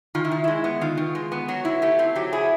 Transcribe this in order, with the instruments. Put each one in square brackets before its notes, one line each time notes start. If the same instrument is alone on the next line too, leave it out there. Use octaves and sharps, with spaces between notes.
[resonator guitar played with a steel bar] D#3 F4
E4
D#3
G#3 E4
B3
D#3 F4
D#3
G#3
B3
F#3 F#4
E4
A3 G4
C4
F#3 G4
E4 G#4